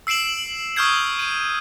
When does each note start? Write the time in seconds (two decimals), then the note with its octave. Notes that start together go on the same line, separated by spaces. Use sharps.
0.07 E6 C7 D7 E7 F#7
0.76 C#6 D#6 F6 G6 G#6 C7
1.19 D#7